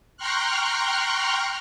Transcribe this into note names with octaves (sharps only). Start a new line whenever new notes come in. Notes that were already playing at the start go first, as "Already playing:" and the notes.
G5 A#5 C6 C#6 F6 F#6